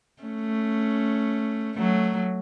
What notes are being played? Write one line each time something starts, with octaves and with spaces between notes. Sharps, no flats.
A3 C#4
F#3 A3